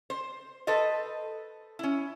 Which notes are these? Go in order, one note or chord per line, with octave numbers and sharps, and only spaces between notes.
C5
A4 B4 C5 D#5
C#4 E4